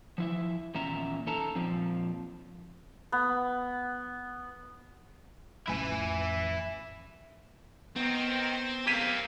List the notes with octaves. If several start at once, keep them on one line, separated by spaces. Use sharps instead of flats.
F3 E4 E5
E2 A#2 D#3 C#4 E5 A#5
D#4 A4 A5 A#5
A#2 F3 C4
B3
A1 F2 E4 G#5
D#3 B3 C4
A#3 C4 G4 F5 G#6 B6 D#7